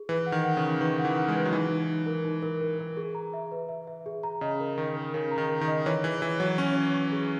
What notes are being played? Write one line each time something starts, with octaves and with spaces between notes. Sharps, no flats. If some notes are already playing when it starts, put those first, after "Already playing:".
Already playing: G#4
E3 B4
F#5
D#3
F#5
C#3
C#6
D#3 B4
F#5
E3
F#5
G#3
B4
F#3
E3 D#4
D#4
D#4
A#4
D#4
A#4
A#4
A#4
G#4
A#5
E5
B4
E5
E5
G#4
A#5
C#3 D#5
A#4
D#3 A#4
A#4
C#3 A#4
A#5
D#3
A#4
D#3
D#5
E3 C#5
E3 G#4
E3 C#5
F#3 C#5
C#4 C#6
C#5
C#6
G#4